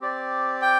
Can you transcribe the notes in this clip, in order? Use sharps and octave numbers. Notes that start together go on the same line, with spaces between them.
C4 G4 D5
G5